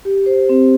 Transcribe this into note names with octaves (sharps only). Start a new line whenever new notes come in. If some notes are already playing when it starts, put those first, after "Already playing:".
G4
C5
C4